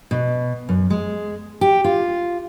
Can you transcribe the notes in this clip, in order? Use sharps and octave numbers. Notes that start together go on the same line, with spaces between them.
B2
F#2
G#3
G4
F4